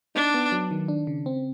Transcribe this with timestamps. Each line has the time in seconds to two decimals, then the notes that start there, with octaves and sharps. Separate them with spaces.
0.15 D4 D#4
0.34 B3
0.52 F#3
0.71 D#3
0.88 D4
1.07 C#3
1.26 C4